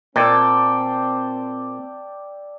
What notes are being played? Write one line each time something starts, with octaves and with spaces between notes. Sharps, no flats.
A#2 C4 D5 G5 A5 D6 E6